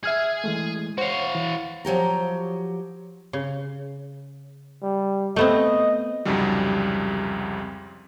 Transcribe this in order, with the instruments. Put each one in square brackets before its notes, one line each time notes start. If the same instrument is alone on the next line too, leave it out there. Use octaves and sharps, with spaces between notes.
[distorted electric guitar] G#4 [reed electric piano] E5 F6 G#6
[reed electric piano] E3 G#3 A3
[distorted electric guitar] F#4 F5 [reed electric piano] C5 C#5
[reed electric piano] E3
[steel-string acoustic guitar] F3 F#3 G4 A#5
[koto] C#3
[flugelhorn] G3
[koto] A3 B3 C4 [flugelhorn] D#5
[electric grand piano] C2 F2 G#2 C#3 F#3 G3